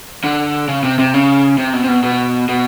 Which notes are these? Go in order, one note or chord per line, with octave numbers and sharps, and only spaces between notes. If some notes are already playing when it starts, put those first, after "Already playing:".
D3
C#3
C3
C3
C#3
C3
B2
C3
B2
B2
B2